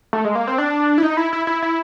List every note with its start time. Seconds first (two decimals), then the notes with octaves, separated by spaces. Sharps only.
0.13 A3
0.25 G#3
0.35 A#3
0.47 C4
0.58 D4
0.98 E4
1.03 D#4
1.17 E4
1.33 E4
1.47 E4
1.63 E4